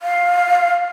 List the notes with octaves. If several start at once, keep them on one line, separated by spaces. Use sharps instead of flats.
F5